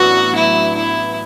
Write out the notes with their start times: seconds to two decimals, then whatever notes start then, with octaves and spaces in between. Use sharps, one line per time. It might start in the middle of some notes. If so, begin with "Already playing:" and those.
Already playing: A1 A2 F#3 B3 D4 F#4
0.36 E4
0.75 E4